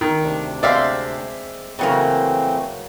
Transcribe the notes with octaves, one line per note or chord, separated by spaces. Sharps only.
D#3
D2 C3 D4
G#3 C4 D5 E5 F5
C#3 E3 F#3 A3 A#3 C4